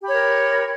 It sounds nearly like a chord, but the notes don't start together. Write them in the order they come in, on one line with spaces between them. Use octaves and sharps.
G4 B5 C#5 A#4